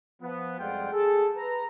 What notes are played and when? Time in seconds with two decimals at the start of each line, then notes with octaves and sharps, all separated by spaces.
0.22 F3 B3
0.59 F2 G3 G#3 F4 F#5 G5
0.92 G#4 A4
1.36 B4 A#5